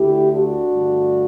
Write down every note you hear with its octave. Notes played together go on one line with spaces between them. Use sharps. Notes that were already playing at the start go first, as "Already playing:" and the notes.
Already playing: D2 D3 A3 E4 G4
D4 F#4
G2 D3 A3